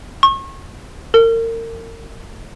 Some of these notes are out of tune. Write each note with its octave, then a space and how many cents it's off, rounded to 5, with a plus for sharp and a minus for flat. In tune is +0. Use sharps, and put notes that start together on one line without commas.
C#6 -35
A#4 -35